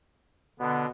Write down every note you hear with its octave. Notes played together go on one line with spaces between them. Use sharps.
B2 D3 B3